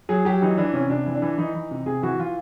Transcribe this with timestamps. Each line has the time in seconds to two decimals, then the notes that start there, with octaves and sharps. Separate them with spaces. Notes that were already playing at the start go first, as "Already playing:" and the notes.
0.09 F#3 G#4
0.25 F#3 G4
0.42 E3 D#4
0.57 E3 D4
0.73 C3 C#4
0.90 C3 D4
1.06 E3
1.15 D4
1.22 E3
1.38 E3 D#4
1.54 E3
1.71 C3
1.86 C3 G#4
2.02 E3 F#4
2.18 E3 F4